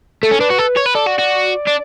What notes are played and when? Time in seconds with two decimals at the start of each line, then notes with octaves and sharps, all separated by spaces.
0.23 A3 A4
0.31 C#4
0.40 D4 B4
0.50 F#4
0.59 A4
0.77 C#5
0.86 B4
0.95 A4 D5
1.07 F#4
1.19 F#4
1.67 D4